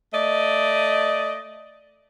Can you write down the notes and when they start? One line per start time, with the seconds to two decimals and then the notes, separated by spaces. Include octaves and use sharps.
0.13 A3 D5 D#5